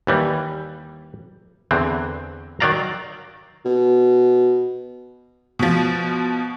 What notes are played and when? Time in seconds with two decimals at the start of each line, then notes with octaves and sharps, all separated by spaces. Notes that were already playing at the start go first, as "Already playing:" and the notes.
0.07 D#2 E3 G3
1.71 E2 D3 E3 C4
2.60 D#3 F#3 D5 F5 A#5
3.65 B2
5.59 B2 F3